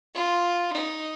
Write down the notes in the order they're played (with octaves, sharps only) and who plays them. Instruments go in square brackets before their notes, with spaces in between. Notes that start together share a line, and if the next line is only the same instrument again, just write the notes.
[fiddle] F4
D#4